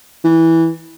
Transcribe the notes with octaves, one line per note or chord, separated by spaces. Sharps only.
E3